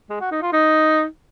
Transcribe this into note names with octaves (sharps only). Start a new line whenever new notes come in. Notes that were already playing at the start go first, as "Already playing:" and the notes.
G#3
F#4
D#4
F4
D#4